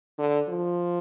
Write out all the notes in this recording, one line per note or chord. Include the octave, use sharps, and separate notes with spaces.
D3
F3